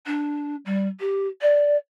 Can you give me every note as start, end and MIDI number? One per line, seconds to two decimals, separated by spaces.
0.06 0.55 62
0.65 0.87 55
1.00 1.27 67
1.41 1.76 74